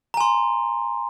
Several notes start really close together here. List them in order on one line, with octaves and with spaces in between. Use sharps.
A#5 G#5 C6